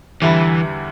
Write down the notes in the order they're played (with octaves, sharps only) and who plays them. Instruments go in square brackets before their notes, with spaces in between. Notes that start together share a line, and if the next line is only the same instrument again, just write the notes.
[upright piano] E2 D3 G3 E4 [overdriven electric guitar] E3